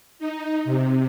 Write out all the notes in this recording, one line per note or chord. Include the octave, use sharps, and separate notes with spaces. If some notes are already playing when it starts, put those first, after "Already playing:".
D#4
C3